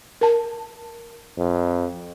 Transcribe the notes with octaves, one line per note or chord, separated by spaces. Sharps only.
A#4 A5
F2